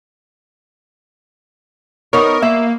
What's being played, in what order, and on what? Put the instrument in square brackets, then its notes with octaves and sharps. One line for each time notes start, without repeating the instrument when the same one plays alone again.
[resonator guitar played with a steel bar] B3 D#4 C#5 [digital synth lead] A#4
[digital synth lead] A#3 [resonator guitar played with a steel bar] E5